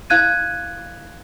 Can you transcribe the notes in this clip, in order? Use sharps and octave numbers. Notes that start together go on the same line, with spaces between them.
E4 F5 F#6 G#6 D#7